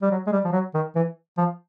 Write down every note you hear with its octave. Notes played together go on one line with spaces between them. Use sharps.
G3
F#3
G#3
G3
F3
F#3
D#3
E3
F3